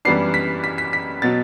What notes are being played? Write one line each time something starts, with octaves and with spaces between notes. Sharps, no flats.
F#2 E3 G3 B3 D4 C7
B6
B6
B6
B6
B2 F#3 A6